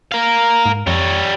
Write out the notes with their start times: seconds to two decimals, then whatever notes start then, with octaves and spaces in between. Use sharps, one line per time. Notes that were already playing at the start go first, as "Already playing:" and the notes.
0.12 A#4 F5
0.66 G#2
0.87 F2 G3 C#5